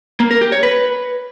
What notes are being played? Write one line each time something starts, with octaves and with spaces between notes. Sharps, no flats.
A#3
A#4
G4
C#5
B4